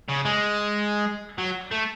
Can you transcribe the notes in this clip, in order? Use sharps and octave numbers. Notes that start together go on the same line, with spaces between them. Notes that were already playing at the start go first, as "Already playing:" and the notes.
C#3
G#3
F#3
A3